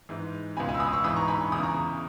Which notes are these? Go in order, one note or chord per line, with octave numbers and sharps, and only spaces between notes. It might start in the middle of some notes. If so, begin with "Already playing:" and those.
G#2 E3
C#2 B2 G#5 B5
G#5 B5
E6
B5 D#6
C#6 E6
G#2 E3 B5 D#6
A#5 C#6
G#5 B5
C#6
E2 C#3 E3 D#6
A#5 C#6